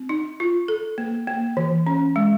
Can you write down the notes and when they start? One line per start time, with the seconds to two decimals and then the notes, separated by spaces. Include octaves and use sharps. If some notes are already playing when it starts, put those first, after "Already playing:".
Already playing: C4
0.09 D#4
0.40 F4
0.68 A4
0.98 A#3
1.27 A#3
1.57 E3
1.87 C#4
2.16 G#3